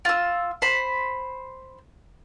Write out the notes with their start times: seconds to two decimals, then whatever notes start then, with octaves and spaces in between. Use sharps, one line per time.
0.05 F4 E6
0.62 C5 B5